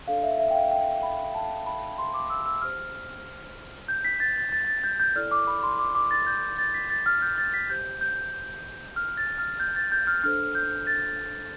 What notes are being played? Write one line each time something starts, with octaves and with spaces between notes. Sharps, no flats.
D4 A4 D5 F5
E5
E5
G5
F5
G5
B5
A5
B5
C6
D6
E6
E6
G4 C5 F6
G6
B6
A6
A6
A6
A6
G6
G6
E4 A4 D5 F6
D6
B5
C6
D6
D6
A6
G6
A6
B6
A6
F6
G6
A6
B6
G4 C5 G6
G6
F6
A6
F6
G6
A6
G6
F6
D4 A4 C5 F6
G6
A6